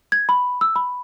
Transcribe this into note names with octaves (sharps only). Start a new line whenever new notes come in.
G#6
B5
E6
B5